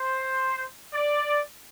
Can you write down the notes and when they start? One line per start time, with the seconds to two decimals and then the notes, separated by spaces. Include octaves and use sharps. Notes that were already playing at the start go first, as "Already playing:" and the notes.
Already playing: C5
0.93 D5